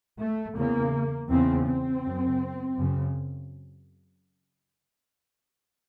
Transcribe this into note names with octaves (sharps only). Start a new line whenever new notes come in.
A3
E2 C#3 A#3
E2 C#3 C4
C4
F#2 C#3
F#2 C#3